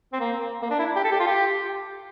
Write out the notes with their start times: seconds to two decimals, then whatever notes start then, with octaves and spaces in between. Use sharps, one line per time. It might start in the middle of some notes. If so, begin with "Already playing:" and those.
0.13 C4
0.20 A#3
0.62 A#3
0.71 D4
0.79 E4
0.96 G4
1.04 A4
1.12 G4
1.20 F4
1.27 G4